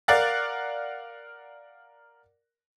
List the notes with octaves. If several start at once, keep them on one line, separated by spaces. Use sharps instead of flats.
A#4 D5 F5 F#5 F#6 A6